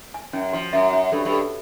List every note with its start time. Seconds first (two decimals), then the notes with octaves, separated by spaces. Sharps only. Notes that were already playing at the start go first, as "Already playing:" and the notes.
0.14 G#5
0.33 F#2 C#4
0.53 F3 F#4
0.73 F#2 E5
0.93 C#4
1.12 G2 A4
1.25 G2
1.32 A4